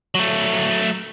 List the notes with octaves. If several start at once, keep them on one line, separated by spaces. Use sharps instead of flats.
F#3 A3